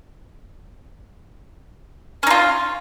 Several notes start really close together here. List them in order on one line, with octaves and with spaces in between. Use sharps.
C#4 D#4 F4